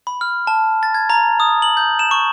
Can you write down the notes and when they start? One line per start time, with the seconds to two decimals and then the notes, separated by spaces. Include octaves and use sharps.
0.07 B5
0.21 F6
0.47 A5
0.83 A6
0.94 G#6
1.10 A#5
1.40 D#6
1.62 F#7
1.77 G6
1.99 E7
2.11 C#6